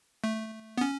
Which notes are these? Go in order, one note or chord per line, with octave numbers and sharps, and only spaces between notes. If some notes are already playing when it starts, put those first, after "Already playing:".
A3
B3
C#4